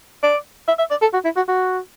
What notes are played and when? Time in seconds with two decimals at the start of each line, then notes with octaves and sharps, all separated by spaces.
0.23 D5
0.68 E5
0.79 E5
0.91 D5
1.02 A4
1.13 F#4
1.25 E4
1.36 F#4
1.48 F#4